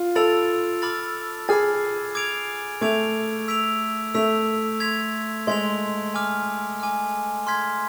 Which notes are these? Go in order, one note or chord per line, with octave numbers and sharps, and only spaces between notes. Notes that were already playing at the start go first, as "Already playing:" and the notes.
Already playing: F4
A4 B5 E6 A6 D7 F7
B5 D6 F6 A6
G#4 B5 D6 F6 A6
D6 G#6 D7 F7
A3 D6 G#6 D7 F7
E6 B6 D7 F7
A3 E6 B6 D7 F7
C6 G#6 B6 F7
G#3 C6 G#6 B6 F7
G#5 D6 F6
G#5 D6 F6
C6 F6 G#6 B6